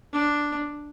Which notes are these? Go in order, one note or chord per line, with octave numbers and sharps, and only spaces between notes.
D4